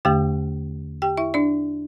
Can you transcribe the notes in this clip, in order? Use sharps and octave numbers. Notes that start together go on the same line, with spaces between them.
E2 D3 A3 G4 G5
G4 G5
E4 E5
D4 D5